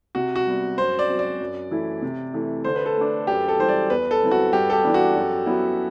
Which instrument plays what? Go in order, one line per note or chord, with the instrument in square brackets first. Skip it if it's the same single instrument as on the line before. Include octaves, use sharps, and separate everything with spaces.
[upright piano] C3 [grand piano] F#4
[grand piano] F#4
[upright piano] G3 B3
[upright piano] F#2 [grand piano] C5
[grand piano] D5
[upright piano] F#3 C4
[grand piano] D5
[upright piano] F#2
E3 A3 E4
C3
E3 A3
[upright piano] D3 [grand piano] C5
[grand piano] B4
A4
[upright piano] A3 D4
[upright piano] F#2 [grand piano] G4
[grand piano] A4
[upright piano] E3 G3 [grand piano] C5
[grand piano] D5
[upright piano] E2 [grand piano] B4
[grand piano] A4
[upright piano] D3 G3 C4 E4
[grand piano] F#4
[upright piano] G2 [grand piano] G4
[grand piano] A4
G4
[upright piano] E3 G3 B3 D4
[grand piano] F#4
[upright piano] F#2
F#3 B3 E4